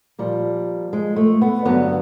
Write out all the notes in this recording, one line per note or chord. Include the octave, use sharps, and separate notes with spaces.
A#2 F3 G3
G#3
A3
B3
G2 D3 F#3 B3